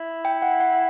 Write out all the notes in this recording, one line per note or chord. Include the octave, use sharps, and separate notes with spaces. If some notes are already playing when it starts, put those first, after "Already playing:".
Already playing: E4
G5
F#5
F#5